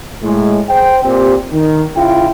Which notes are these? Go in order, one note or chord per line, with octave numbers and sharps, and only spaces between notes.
A2 G#3
G#4 C5 G5
A#2 C4 G4
D#3
C#3 E4 F4 G5